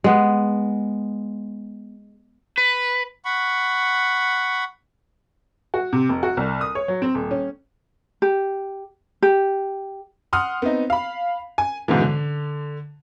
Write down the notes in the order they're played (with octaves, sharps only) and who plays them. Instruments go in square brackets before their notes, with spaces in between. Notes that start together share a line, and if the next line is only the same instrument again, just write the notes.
[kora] G#3 B3
[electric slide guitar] B4
[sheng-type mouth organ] F#5 B5 C#6
[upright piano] F#4
C3
F1
F#4
C2
D#6
C#5
F#3
C4
D#1
C#4
[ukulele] G4
G4
[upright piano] F#5 C6 D#6 F6
B3 C4 D#4
F5 B5
G#5
G#2 B2 D3 E3
D3